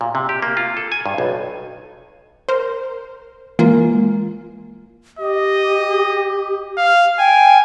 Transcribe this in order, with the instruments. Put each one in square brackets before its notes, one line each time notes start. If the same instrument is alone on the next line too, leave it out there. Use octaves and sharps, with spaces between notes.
[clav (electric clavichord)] A#2
C3
G4
A#3
F4
A4
G#5
G2
B1
[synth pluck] A#4 C5
[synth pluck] E3 F4 [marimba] G#3 [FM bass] A#3
[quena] G4 [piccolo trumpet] D#5
[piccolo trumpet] F5
[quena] G5 [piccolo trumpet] G#5